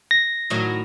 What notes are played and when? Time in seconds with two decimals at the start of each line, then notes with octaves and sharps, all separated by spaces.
0.11 A#6
0.50 A2 D#3 F#3